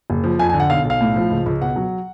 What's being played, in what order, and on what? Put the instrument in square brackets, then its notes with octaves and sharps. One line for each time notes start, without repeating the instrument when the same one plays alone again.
[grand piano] F#1
F3
F2 G#5
G#5
D3
F#5
B1 F5
B1
F5
A2
F3
C#2
C#2
B2 F#5
F#3